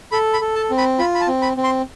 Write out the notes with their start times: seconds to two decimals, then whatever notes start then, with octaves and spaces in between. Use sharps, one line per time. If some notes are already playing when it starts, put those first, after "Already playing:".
0.12 A4 B5
0.34 B5
0.41 A4
0.56 A5
0.70 C4
0.78 B5
0.99 F4 B5
1.15 B5
1.21 A5
1.27 C4
1.42 B5
1.57 C4
1.64 C6